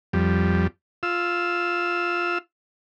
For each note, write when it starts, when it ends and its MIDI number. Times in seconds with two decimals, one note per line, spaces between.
0.13 0.67 41
0.13 0.67 55
1.03 2.38 65
1.03 2.38 88